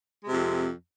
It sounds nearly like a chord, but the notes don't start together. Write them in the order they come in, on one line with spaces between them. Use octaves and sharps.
G#3 C3 F2